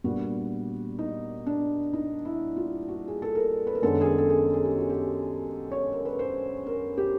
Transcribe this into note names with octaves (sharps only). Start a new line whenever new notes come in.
A#2 G3 B3 D4 F#4
D#4
D4
D#4
E4
F4
F#4
G#4
A4
A#4
B4
A#4
F#2 D#3 G#3 B3 D4 A4
G#4
A4
A4
G#4
G#4
G4
F#4
G4
C#5
A#4
B4
C5
A#4
G4